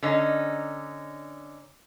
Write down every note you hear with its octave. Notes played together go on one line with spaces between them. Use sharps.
D3 C#4 D#4